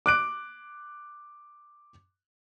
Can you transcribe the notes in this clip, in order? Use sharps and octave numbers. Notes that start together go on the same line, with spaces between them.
D6 F#6 D7